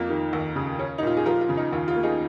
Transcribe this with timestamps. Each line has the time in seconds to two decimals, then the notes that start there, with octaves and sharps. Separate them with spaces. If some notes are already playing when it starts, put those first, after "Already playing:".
Already playing: F2 A#3 F4 A#4
0.09 D#3
0.33 D#2
0.56 C#3
0.79 C#4
0.98 D#4
1.03 A#2 F4
1.17 G#4
1.26 F3 F4 A#4
1.41 F4
1.49 C#3
1.57 D#4
1.73 D#2 F4
1.88 F4
1.96 A#3
2.03 D#4 G#4